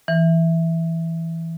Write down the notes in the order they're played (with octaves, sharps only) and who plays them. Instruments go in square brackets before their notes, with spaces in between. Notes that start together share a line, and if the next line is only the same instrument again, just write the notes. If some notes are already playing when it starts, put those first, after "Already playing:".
[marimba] E3